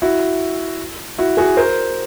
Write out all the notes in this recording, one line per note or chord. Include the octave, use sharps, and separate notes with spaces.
E4 F#4
E4 F#4
F#4 G#4
A#4 C5